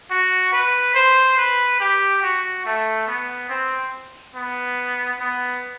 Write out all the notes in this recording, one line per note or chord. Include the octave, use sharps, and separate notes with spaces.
F#4
B4
C5
B4
G4
F#4
A3
B3
C4
B3
B3